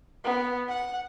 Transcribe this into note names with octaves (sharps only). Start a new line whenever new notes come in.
B3
F#5